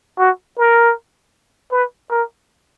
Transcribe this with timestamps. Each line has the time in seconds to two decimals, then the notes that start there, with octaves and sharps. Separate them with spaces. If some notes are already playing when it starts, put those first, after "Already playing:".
0.18 F#4
0.58 A#4
1.72 B4
2.10 A#4